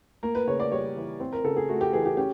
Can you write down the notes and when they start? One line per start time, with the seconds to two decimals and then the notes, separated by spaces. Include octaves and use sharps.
0.23 A#3 A#4
0.35 B4
0.47 C#3 C#5
0.60 D5
0.72 G3 C#5
0.96 E3
1.20 C4
1.32 A#4
1.44 C#3 A4
1.56 G#4
1.69 A3 F#4
1.81 G4
1.93 E3 G#4
2.05 G4
2.17 C#4 G4